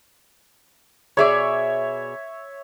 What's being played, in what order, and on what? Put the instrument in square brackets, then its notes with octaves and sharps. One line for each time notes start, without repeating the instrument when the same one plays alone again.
[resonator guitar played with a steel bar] B2 G#4 D5 [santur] C#5 E5